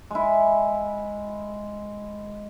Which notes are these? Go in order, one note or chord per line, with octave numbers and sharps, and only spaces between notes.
G#3 E4